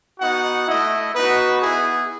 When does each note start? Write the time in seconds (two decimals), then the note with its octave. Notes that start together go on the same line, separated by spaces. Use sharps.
0.20 B3 D#4 F#4 F#5
0.67 A3 E4 D#5
1.15 B3 D#4 F#4 B4
1.62 B3 E4 G#4